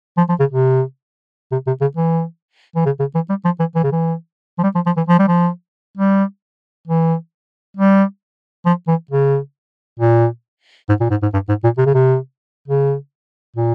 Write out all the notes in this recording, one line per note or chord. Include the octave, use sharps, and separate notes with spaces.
F3
F3
C#3
C3
C3
C3
C#3
E3
E3
C#3
C#3
E3
G3
F3
E3
E3
C#3
E3
F3
G3
F3
F3
E3
F3
G3
F3
G3
E3
G3
F3
E3
C#3
A#2
G#2
A#2
G#2
G#2
G2
G#2
A#2
C3
C#3
C3
C#3
A#2